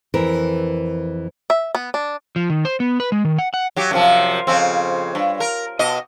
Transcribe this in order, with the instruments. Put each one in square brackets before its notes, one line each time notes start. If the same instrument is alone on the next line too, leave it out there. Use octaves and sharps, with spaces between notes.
[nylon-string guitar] F2 E3 A#4
[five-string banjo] E5
B3
D4
[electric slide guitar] F3
D#3
C5
B3
B4
G#3
D#3
F#5
F#5
[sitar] F#3 G4
F#2 C3 F3
F2 C#3 C4
G2
A#4
B2 D#5